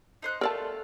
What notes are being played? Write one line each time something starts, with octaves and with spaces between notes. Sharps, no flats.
D#4 C5 F#6
A3 F4 A#4 D5 A5